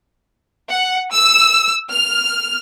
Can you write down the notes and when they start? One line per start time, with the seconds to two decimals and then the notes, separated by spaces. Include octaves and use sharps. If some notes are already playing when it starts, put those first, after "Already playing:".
0.71 F#5
1.12 E6
1.89 F6